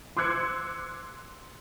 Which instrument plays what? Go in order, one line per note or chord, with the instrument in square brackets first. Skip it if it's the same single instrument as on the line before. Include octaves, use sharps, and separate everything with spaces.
[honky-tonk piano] C6 D6 E6 F#6 G#6 C#7